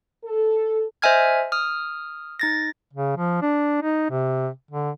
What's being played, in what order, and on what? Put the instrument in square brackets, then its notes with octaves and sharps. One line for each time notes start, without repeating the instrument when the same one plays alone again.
[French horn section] A4
[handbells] C5 D#5 E5 G#5 F6 G#6
D#6 F6
D#4 A6 A#6
[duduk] C#3
F3
D4
D#4
C3
D3